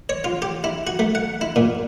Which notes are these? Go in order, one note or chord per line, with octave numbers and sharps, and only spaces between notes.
C#5
F4
G4
E4
F#4
A3
F#5
E4
A#2